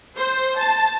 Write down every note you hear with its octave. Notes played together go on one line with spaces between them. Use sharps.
C5
A5